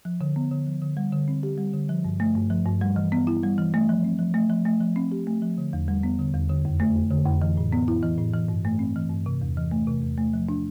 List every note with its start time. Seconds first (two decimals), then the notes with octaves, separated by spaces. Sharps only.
0.05 F3
0.21 D3
0.36 B3
0.51 D3
0.66 F3
0.82 D3
0.97 G3
1.13 D3
1.28 C4
1.43 G4
1.58 G3
1.73 D3
1.89 F3
2.05 G2
2.20 A3
2.35 G2
2.50 F3
2.66 G2
2.81 G3
2.96 E3
3.12 B3
3.27 E4
3.43 G3
3.58 E3
3.74 A3
3.89 F3
4.05 C4
4.19 F3
4.34 A3
4.50 F3
4.66 A3
4.81 F3
4.96 C4
5.12 G4
5.27 A3
5.42 F3
5.58 D3
5.73 E2
5.88 G3
6.03 B3
6.19 D3
6.34 E2
6.49 D3
6.65 F2
6.80 A3
6.96 F2
7.11 D3
7.26 F2
7.42 E3
7.57 A2
7.73 B3
7.88 E4
8.02 E3
8.18 A2
8.34 E3
8.48 G2
8.65 A3
8.79 C4
8.96 E3
9.10 G2
9.26 C3
9.41 E2
9.57 E3
9.71 A3
9.87 C3
10.02 E2
10.18 A3
10.33 F3
10.49 D4